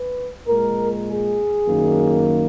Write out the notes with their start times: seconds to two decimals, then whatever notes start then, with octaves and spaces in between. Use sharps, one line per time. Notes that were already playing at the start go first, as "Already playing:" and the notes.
Already playing: B4
0.48 A#2 G#3 A#4
1.08 G#4
1.68 F#2 D#3 A#3